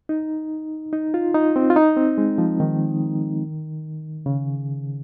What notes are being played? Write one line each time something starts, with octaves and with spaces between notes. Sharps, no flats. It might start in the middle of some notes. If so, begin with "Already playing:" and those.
D#4
D#4
F4
D#4
C4
F4
D#4
C4
G#3
F3
D#3
C#3